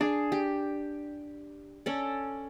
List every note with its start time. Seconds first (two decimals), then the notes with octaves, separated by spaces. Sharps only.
0.01 D4 G#4
0.32 G4
1.86 C#4 A4 D5